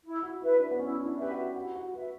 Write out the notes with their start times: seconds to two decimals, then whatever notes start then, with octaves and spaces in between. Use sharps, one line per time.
0.03 E4
0.23 F#4
0.42 E4 B4 E5
0.60 D4
0.71 B3
0.79 C#4 E4
1.05 D4
1.18 G4 B4 E5
1.31 F#4
1.55 E4 F#4
1.75 F#4
1.94 F#4 B4 E5